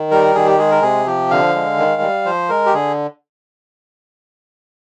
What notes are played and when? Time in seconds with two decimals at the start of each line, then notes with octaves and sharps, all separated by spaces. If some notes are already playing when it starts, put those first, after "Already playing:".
Already playing: D#3
0.11 G3 A#4
0.35 D#3 G#4
0.46 G4
0.58 G#3 G#4
0.71 A#4
0.82 C3 G#4
1.06 F3 G4
1.31 D3 F5
1.55 G#3
1.78 D#3
2.01 G3
2.25 F3 C5
2.49 G#3 A#4
2.66 G4
2.74 D3 G#4